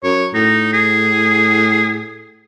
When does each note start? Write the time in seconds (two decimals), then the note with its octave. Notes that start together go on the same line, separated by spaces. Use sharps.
0.03 F#2 C#5
0.34 A2 D#4
0.73 G#4